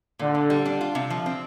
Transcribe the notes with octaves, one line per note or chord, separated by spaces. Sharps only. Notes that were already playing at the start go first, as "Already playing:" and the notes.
A#2 D3
A#2
G3
D4
F4
C3
F3
C4